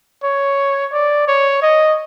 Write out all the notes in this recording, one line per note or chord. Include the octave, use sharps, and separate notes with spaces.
C#5
D5
C#5
D#5